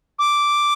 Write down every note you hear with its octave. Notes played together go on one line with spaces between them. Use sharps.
D6